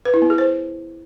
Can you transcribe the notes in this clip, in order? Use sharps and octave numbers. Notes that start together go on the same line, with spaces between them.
B4
E4
B3
G#4
C5